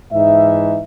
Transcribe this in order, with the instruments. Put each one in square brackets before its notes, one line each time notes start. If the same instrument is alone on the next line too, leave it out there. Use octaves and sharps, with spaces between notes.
[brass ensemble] G#2 E3 D#4 E5